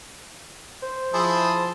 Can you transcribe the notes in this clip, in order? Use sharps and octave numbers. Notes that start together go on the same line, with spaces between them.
C5
F3 E4 G#4 A5 C6